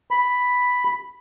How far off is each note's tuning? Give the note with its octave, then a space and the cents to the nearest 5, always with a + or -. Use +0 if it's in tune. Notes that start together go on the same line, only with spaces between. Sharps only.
B5 +0